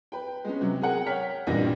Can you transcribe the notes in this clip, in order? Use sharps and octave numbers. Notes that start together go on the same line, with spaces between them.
B4 G5
G#3 B3 C#4
C3 F#3
G#4 A#4 F#5 G5
C#5 G5 F6 B6
A1 E2 G2 A#2 G3 A#6